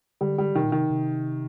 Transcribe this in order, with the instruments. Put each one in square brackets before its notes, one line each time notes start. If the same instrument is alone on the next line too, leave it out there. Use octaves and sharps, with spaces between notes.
[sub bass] D3 [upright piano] G3
[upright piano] G3
[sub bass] C3 [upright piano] D#3
[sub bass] A#2
[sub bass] C3 [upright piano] D#3
[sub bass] C3